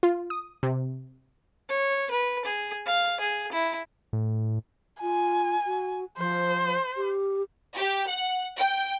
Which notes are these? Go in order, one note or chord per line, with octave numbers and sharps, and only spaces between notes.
F4
D#6
C3
C#5
B4
G#4
F5
G#4
E4
A2
F4 G#5
F#4
F3 C5
G4
G4
F#5
G5